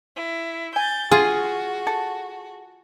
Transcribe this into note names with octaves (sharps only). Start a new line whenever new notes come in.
E4
G#5 G6 A6
F4 F#4 G#4 G#5
A4